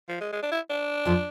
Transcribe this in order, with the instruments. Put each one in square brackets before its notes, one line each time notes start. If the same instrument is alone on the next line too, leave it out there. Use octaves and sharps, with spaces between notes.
[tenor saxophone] F3
G#3
G#3
D4
E4
D4
[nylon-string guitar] F2 F3